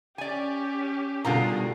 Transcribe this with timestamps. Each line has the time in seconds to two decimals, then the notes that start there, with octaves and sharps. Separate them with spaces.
0.18 C#4 G4 D5 G#5
1.25 G2 B2 D3 D#3 F4 G#4 A#5